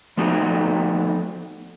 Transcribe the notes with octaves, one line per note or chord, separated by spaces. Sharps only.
F3 A3 B3 D#4 F#4